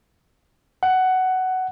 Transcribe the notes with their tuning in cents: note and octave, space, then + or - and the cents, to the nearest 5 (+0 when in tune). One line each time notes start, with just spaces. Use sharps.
F#5 +10